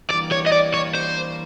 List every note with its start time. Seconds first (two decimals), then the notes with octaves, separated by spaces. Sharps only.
0.10 E3 G3 A#3 D4 D5
0.32 C#5
0.46 D#5
0.52 D5
0.74 C#5
0.95 C5